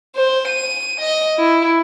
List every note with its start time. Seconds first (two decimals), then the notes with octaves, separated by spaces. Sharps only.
0.16 C5
0.48 D#7
1.00 D#5
1.38 E4